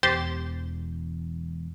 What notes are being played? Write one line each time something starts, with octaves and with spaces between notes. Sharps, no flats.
E1 E2 G4 C5 A6